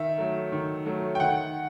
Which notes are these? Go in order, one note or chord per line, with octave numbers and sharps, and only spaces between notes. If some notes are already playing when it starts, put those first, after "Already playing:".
Already playing: D#3 E5
F#3 A3
D#3
F#3 A3
G5
D#3 F#5